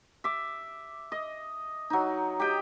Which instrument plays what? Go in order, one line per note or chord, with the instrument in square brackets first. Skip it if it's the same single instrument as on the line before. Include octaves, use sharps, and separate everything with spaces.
[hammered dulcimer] E5 D6
D#5
F#3 D#4
G4 D#5 G5